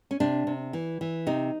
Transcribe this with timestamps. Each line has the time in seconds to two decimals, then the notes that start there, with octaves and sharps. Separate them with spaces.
0.11 C#4
0.20 C3 D4
0.47 C3
0.73 E3
1.01 E3
1.27 C3 D#4